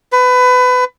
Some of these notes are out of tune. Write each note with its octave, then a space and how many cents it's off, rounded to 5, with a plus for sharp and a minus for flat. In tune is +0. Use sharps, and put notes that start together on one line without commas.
B4 +25